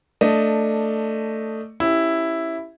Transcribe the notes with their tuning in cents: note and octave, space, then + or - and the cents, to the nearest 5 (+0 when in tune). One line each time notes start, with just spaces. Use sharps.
A3 +10 D4 +0 D#5 +0
C#4 -10 E4 +0 G4 +0